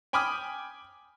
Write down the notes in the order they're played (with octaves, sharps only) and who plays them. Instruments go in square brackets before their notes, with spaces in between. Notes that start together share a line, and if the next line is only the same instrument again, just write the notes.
[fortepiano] G5 G#5 B5 D6 D#6 F6